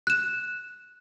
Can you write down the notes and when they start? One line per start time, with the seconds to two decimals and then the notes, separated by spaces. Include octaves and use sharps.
0.07 F#6 E7